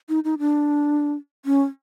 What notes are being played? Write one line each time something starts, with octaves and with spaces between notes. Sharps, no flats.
D#4
D#4
D4
C#4